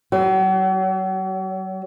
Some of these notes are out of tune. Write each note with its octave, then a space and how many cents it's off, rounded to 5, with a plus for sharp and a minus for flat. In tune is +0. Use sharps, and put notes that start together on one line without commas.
F#3 +40